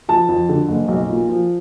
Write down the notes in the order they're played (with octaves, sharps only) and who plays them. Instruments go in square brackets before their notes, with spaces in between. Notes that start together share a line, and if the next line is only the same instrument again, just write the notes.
[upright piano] F3 A5
F2
D3
F#1
B1
A#2
F3